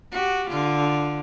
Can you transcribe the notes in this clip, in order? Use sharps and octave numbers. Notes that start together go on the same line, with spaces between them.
F#4 G4
D3 F4